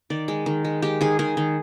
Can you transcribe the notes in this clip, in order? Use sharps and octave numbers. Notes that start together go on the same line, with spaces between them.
D#3 D5
G#3
D#3
G#3
G#3 G4
D#3 G#4
D#3 G#4
D#3